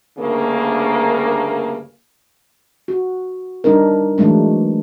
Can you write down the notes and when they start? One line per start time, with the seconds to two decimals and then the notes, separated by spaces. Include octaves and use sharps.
0.18 D2 G2 C#3 A#3
2.88 F#4
3.64 G3 D4 D#4 A#4
4.18 E3 F#3 G#3 A3 D4